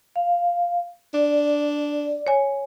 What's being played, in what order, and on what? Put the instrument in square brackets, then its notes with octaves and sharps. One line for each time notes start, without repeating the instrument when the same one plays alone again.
[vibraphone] F5
[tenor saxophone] D4 [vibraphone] D5
[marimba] C#5 G#5